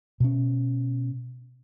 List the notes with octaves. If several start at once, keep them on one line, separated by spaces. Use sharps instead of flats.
B2 C#4